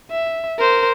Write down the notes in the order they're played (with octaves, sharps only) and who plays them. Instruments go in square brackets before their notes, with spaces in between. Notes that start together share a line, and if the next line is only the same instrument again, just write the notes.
[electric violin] E5
A#4 C5